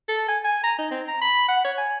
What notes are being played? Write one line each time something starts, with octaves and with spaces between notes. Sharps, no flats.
A4
G#5
G#5
A#5
D#4
C4
A#5
B5
F#5
C#5
G#5